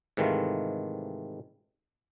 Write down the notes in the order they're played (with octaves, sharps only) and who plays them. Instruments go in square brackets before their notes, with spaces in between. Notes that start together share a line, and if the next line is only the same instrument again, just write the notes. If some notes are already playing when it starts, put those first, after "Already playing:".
[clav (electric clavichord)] G#2 C3 D#3 E3 A3 F4